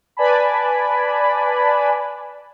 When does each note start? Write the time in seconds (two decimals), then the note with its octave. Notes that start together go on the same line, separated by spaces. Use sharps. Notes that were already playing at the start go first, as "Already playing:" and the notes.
0.17 B4 D5 G#5 A5 B5